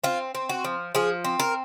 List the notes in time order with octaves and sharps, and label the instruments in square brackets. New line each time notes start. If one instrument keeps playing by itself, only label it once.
[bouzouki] C4 F4
C4
F#4
F3
F3 G#4
C4
A#4